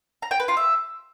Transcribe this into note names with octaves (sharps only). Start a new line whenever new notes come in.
A#5
G5
B4
F4
E5